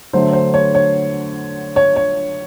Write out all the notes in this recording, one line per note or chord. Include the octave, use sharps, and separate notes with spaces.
D3 F#3 A3 C5
C5
C#5
C#5
C#5
C#5